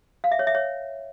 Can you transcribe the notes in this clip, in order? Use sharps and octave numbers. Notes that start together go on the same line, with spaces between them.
F5
E5
C#5
E5
C#5